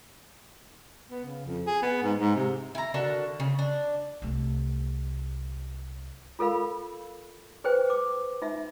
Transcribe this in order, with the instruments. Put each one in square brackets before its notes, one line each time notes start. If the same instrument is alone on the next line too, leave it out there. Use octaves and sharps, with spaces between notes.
[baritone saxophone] B3
C#3
F2
G#4
B3
G#2
G#2
C3
[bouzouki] E4 A#5
D3 F#4 A#4 A5
C#3
D4
[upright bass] C2 A3
[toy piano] F4 A4 A#4 F5 B5
G#4 B4 C5 G5
D6
D#4 E5